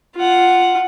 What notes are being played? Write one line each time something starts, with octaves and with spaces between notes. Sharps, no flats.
F4 F#5